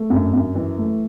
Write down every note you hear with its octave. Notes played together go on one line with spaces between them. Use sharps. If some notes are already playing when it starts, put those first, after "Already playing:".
Already playing: A3
F#2
F#2
E3
A3